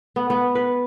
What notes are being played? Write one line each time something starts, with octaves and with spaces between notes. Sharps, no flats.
B3
B3
B4